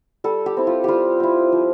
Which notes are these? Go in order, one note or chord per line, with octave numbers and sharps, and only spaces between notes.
G3 A4
G4
C4 E4
F4
G3 F4 G4
C4 E4
F3